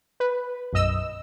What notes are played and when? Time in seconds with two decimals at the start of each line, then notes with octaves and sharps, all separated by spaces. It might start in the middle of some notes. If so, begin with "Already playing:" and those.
0.20 B4
0.73 B1 F#2 D#5 E6